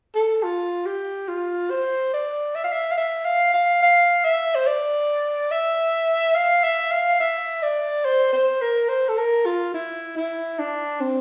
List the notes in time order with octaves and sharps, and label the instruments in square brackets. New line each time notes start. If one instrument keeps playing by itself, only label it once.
[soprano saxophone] A4
F4
G4
F4
C5
D5
E5
F5
E5
F5
E5
F5
F5
F5
E5
C5
D5
E5
F5
E5
F5
E5
D5
C5
C5
A#4
C5
A4
A#4
F4
E4
E4
D4
C4